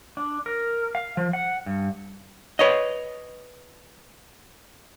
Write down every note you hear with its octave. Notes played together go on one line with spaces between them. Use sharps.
D4
A#4
F5
F3
F#5
G2
B4 C#5 D#5